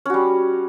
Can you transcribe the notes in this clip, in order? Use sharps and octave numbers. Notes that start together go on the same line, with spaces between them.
G3 C#4 F#4